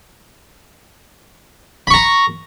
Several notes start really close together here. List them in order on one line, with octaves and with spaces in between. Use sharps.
B5 C#6 A#5